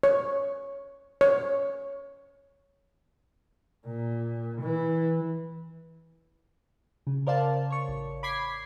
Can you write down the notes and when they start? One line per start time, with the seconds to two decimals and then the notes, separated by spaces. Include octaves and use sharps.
0.03 C#5
1.21 C#5
3.87 A#2
4.61 E3
7.07 C#3
7.27 A#4 C5 D5 F5 A5
7.70 C#5 C#6
7.88 A1
8.23 B5 D6 G#6 B6 C7